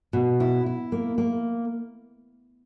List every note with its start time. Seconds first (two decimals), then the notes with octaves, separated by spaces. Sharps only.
0.13 B2
0.40 E4
0.66 E4
0.92 A#3
1.18 A#3